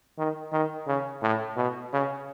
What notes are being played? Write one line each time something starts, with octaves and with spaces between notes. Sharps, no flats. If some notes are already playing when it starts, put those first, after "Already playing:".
D#3
D#3
C#3
A2
B2
C#3